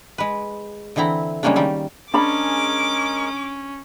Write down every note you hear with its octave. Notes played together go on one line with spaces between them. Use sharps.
G#3 B4
D3 E3 C4 E4 A#5
C#3 G3 G#3 A#3 C#4 D4
D#3 G3 A#3
G#3 C#4 D4 G#4 A#4 B5 D6